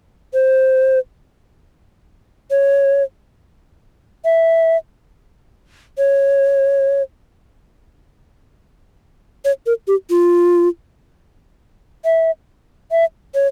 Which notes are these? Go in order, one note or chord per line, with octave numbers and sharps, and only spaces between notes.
C5
C#5
E5
C#5
C#5
A#4
G4
F4
E5
E5
C#5